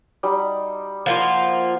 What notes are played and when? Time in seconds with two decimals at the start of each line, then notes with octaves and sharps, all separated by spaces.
0.23 G3 D#4
1.06 F3 A#3 F4 F#5